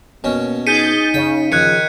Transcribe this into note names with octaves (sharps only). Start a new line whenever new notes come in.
B2 A#3 C#4
D#4 G#4 G6 A6 B6 C#7 D#7
C#3 G5
D#3 F3 F#6 G#6 C#7